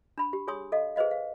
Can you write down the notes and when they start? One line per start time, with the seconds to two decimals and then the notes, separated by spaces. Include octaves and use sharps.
0.18 D4 B5
0.33 G4
0.48 G#4 C#5 G#5 C6 D#6
0.72 A4 D#5 F5
0.96 G#4 B4 C5 D#5 F5
1.11 F5